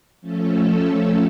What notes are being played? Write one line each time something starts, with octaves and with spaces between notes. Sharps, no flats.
F3 A3 C#4 A4